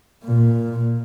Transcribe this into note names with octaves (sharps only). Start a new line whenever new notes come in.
A#2